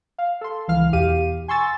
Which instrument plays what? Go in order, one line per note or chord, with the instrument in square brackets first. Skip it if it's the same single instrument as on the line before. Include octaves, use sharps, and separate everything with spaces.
[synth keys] F5
A4 C6
C#2 E3 F5 F6
E2 B2 G4 F5 D#7
G#5 C6 C#6 E6 A6